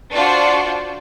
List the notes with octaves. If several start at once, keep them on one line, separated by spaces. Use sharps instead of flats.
D4 F4 F#4 C5